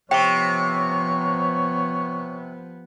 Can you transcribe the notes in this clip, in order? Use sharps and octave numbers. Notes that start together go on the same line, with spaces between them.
C3 F3 B3 C#5 G5 C#6